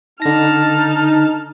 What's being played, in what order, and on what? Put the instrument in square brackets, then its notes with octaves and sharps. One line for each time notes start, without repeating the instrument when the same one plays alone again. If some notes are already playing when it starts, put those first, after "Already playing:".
[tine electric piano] D3 A#6 [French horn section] D#4 [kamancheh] A5 F6